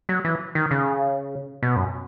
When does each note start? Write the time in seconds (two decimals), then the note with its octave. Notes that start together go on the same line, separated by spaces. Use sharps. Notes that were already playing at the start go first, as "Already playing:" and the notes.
0.09 F#3
0.25 E3
0.55 D#3
0.71 C#3
1.63 B2
1.76 F#2